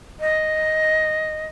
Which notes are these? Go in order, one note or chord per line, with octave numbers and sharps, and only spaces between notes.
D#5